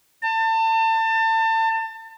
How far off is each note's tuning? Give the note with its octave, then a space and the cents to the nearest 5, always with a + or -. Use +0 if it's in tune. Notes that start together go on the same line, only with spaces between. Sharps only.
A5 +30